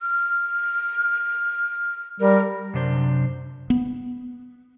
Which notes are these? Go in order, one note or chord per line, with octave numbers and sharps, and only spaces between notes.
F6
G3 A#4
F#2 C3 D4 C5
B3